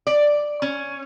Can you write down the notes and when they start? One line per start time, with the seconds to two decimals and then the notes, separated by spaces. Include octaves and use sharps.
0.07 D5
0.62 C#4